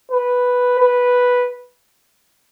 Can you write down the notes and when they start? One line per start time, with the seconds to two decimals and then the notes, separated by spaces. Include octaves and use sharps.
0.11 B4
0.79 B4